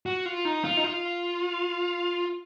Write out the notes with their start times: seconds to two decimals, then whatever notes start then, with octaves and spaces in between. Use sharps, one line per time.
0.06 F#4
0.26 F4
0.45 D#4
0.64 F4
0.77 D#4
0.84 F4